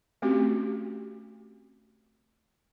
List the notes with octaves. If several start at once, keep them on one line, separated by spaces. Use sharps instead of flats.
A3 C4 C#4 F#4 G4